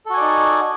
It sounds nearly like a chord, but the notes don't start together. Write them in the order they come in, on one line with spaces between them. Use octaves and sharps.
A4 F#4 G#5 D5 D#4